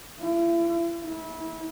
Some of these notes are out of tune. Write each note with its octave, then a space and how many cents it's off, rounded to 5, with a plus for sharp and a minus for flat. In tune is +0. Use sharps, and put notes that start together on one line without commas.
E4 +40
E4 -25